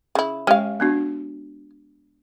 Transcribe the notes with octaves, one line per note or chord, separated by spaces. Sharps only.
C#3 E4
G#3 C#4 G4 F5 G5
B3 D4 F#4